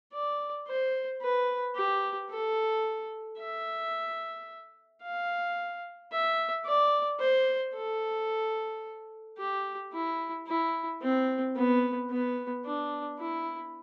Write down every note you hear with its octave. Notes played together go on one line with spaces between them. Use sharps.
D5
C5
B4
G4
A4
E5
F5
E5
D5
C5
A4
G4
E4
E4
C4
B3
B3
D4
E4